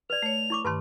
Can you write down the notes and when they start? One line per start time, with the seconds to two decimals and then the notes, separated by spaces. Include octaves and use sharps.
0.10 B4 D5 F7
0.23 A3 C#5
0.50 E4 C#6 D6
0.65 G2 D#3 B4 A5 C6